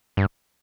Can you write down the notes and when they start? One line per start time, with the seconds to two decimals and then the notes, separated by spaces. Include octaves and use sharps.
0.17 G2